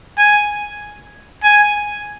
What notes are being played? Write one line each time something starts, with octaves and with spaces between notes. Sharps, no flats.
G#5
G#5